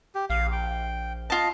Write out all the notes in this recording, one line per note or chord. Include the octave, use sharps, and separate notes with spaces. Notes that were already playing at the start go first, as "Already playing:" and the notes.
G4
A#1 F5
G5
F4 D#5 A5